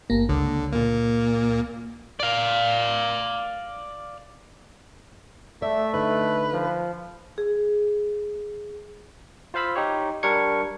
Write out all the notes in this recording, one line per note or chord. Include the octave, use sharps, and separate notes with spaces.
G1 A#3
C#2 D3
A#2 A#3
D5 F5
A3 D5 E5
D3 D#4 B4
F3
G#4
F4 C5 F5 B5 E6
D#4 G4 C#5
G3 D4 A#4 C#6 G#6 C#7